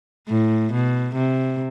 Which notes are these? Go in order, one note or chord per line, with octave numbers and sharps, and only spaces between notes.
A2
B2
C3